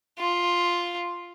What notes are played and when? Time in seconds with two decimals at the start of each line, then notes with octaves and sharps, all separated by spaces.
0.19 F4